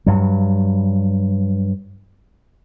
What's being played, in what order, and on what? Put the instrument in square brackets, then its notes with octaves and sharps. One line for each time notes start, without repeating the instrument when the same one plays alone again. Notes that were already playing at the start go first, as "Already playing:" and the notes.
[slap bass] G2 F#3